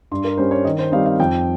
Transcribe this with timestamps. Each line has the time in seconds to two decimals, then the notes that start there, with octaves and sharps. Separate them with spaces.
0.11 G2 C6
0.24 A#4
0.38 G3 C#4 C5
0.51 C#5
0.65 D#3 D#5
0.79 C5
0.92 G3 C4 D#4 F5
1.06 F5
1.20 F2 G5